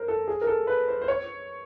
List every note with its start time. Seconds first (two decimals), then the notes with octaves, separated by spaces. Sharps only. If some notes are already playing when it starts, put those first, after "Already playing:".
Already playing: A#4 C5
0.08 A4
0.28 G#4
0.41 A#4
0.47 A4
0.67 B4
0.88 C5
1.02 C5
1.08 C#5